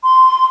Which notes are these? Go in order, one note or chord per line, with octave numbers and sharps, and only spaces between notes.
C6